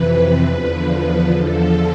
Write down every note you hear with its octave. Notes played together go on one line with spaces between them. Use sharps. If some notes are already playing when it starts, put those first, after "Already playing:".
Already playing: F2 C3 E3 B4
E2 D3 F3 B4
E2 D3 F3 A4